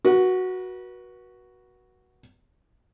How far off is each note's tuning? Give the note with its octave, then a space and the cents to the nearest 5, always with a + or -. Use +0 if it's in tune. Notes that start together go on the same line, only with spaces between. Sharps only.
F#4 +0 B4 -35